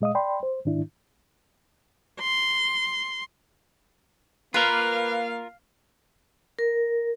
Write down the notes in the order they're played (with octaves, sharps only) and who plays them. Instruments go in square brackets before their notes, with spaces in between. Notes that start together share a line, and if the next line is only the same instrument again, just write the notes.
[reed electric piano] A#2 G#3 D#5 F5 D#6
D5 G5 B5 C6
C5
G#2 D#3 D4 E4
[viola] C6
[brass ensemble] A#3 [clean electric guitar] F4 A#4 [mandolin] B4 [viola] F5
[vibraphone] A#4